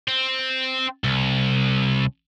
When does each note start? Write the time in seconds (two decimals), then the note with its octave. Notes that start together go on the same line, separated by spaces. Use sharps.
0.08 C4
1.04 C2